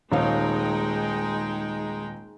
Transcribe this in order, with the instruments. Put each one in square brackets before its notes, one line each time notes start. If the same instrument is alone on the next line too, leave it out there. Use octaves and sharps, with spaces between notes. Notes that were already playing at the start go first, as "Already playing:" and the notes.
[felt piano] D#1 C#5 F5 [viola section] G#3 D#4 G5